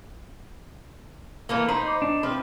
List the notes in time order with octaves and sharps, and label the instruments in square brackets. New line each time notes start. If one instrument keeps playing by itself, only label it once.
[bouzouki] E3 A3 A#3
[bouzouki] D#4 [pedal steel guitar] C5 B5 [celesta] A#5
[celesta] D6
[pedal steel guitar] D4
[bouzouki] F3 E4 B4 [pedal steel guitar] C4